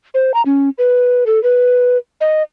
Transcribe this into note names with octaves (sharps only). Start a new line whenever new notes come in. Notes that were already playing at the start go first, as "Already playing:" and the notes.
C5
A#5
C#4
B4
A4
B4
D#5